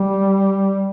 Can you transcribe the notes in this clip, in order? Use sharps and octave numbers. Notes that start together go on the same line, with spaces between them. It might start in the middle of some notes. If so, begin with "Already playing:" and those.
Already playing: G3